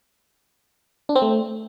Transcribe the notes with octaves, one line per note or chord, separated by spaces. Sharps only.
D4
C4
A3